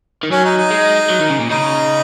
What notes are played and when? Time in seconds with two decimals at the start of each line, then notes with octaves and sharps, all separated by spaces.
0.23 D#3
0.31 F#3 C#4
0.45 D#4
0.58 D#4
0.71 G#3
1.10 F#3
1.21 D#3
1.30 C#3
1.40 A#2
1.50 C#3 D#4